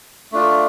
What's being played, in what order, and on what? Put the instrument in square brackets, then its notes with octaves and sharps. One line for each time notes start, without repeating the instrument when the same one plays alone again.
[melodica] A3 D4 F4